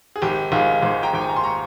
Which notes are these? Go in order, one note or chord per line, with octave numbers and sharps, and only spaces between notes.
G#4
G#1 G4
G#1 F4 G#4
G#1 G#4 C5
G5 A#5
G#1 G5
G#5
A#5
C6
A#5 C#6